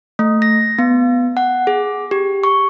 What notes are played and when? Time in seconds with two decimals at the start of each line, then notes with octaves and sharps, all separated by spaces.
0.19 A3
0.42 A#6
0.79 B3
1.37 F#5
1.67 G#4
2.11 G4
2.44 C#6